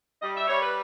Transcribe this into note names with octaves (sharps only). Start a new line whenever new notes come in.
G3 D#5
E5
G3 C#5
B4